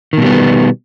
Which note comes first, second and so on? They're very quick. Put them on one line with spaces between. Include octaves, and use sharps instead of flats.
D#3 B2 G3 B3